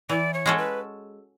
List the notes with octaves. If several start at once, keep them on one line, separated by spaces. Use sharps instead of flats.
E3 D5
C#5
G#3 C#4 F#4 A4
B4